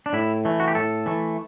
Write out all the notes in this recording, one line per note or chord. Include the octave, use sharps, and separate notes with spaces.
D4
A2 E4
E3 A3
F#4
G4
A2 A4
E3 A3